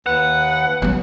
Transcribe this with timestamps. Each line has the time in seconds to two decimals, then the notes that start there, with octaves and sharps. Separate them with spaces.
0.06 D#2 B4 F#5
0.82 F#3 B3